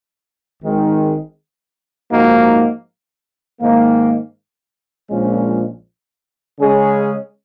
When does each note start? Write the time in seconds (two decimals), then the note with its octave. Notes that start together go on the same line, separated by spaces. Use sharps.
0.62 G#1 G#2 D#3 G#3
2.11 G#2 F3 A#3 D#4 F#4
3.61 G#2 D#3 A#3
5.10 A#1 A#2 F3 G#3 C#4
6.60 C#3 G#3 C#4 G#4